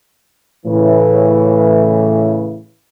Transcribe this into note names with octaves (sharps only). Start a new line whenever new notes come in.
A2 C#3 E3